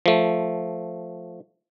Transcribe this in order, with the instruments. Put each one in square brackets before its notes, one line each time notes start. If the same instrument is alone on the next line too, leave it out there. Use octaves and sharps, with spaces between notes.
[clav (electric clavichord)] F3 A3